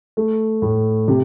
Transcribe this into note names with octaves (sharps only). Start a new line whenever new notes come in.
A3
A2
C3